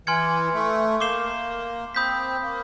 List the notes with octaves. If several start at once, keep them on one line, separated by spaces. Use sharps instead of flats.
E3 G#5 C6 F6 G#6 C#7
A3
A#3 D6 G6 C7 E7 G7
C4 B5 D#6 G6 B6
A#3